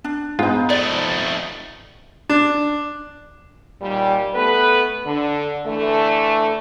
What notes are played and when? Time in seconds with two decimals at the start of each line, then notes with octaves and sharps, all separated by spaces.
0.04 D4
0.39 G#2 B3 D#4 F4
0.70 F2 A3 D5
2.30 D4
3.81 D#2 A#2 G3
4.34 A3 B3 A4 B4
5.05 D3
5.66 D3 E3 A3